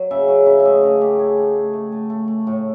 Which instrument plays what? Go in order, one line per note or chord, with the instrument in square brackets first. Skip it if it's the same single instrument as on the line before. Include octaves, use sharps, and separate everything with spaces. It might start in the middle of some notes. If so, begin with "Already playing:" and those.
Already playing: [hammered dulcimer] F#3
C#3 E5
F#3
C#3 E5
E5
A3 D#5
C#3 A#4
A3 G4
A3 G#4
A3
A3
A3
A3
A3
A3
A2